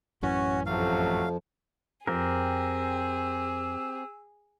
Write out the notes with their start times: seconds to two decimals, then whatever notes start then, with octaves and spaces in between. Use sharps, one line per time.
0.23 A1 F#2 E3 C#4 F#4
0.66 F2 C3 F3 F#3 A3 F5
2.07 F2 C4 G4 G#4 A#4 E6